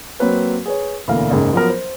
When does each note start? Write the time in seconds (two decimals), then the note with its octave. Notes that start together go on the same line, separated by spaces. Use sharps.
0.20 F#3 A#3 C4 B4 C#5
0.66 G#4 B4 C#5
1.07 E1 D2 A#2 E3 A#4 F5
1.31 F#1 G#2 C#3
1.53 F3 F#3 B3 A#4
1.69 C5